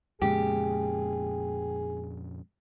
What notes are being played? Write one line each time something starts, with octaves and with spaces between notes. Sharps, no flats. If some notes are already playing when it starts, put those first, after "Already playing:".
F2 A#2 C#3 G#3 B3 G4 G#4